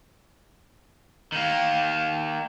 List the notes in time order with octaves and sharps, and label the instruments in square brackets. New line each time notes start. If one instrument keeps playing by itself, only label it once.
[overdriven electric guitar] D#3 A#3